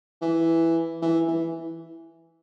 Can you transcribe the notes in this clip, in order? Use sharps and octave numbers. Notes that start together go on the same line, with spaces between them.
E3
E3
E3